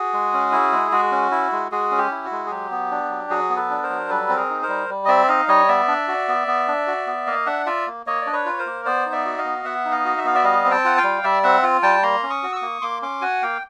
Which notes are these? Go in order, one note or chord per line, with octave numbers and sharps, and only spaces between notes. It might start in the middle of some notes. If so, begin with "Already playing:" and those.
Already playing: F#4 G#4
G#3
C#4
E4
G#3
G#3 F#4
C#4
E4
G#3
G#3 F#4 G#4
C#4
G4
E4
F#4
G#3
G#4
F#3 G4
B3
D4
F#3
F#3 F#4 G#4
B3
A4 B4
D4
A#4 C5
F#3
G3 A4 B4
C4
G#4 A#4
D#4
A#4 C5
G3
G3
D#5
C4 D5 E5
D#4 D#5 F5
G3 C#5 D#5
B3 D5 E5
D4
F#4
B3
B3
D4
F#4
B3
A#3 D#5 F5
D4 E5 F#5
F4 D5 E5
A#3
A#3 C#5 D#5
D5
D4
B4 C#5
F4
C#5
A#4 C5
A#3
B3 C5 D5
D#4
D5 E5
F#4
D#5 F5
B3
B3 E5 F#5
D#4
D#5 F5
F#4
E5
B3 F5
D5 E5
G3 D#5 F5
C4
G5 A5
F4 F#5
F5 G5
G3
G3 D5 E5
C4 E5 F#5
F4
G3 G5 A5
A#3 A#5 C6
C#4
C#6 D#6
F#4
E6
C#6 D#6
A#3
A#3 C6 D6
C#4 C6 D6
F#4 F#5 G#5
A#3 F5 G5